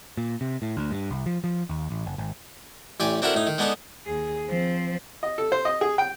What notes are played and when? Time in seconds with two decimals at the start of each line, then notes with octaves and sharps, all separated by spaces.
0.17 A#2
0.41 C3
0.62 A2
0.77 D2
0.91 G2
1.10 C2
1.26 F3
1.44 F3
1.69 D#2
1.90 A1
2.06 F#1
2.18 G#1
3.00 A1 G4 D5 G#5
3.22 C4 D4 E4 F#4 A4 A#4
3.34 A2 D#4
3.47 D#3
3.58 G#3 B3 D4 D#4 A4
4.06 D#2 G#4
4.49 F3 C4
5.23 D#5
5.38 A4
5.52 C5
5.65 D#5
5.81 G#4
5.98 G5